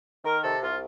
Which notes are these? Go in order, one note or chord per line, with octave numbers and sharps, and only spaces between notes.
D#3 A#4
C3 A4
C2 F4